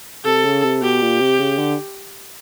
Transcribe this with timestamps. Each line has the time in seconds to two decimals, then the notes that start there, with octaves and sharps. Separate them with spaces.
0.25 C3 A4
0.44 C#3
0.63 C3
0.82 B2 G4
1.02 A#2
1.20 C3
1.39 C#3
1.58 D3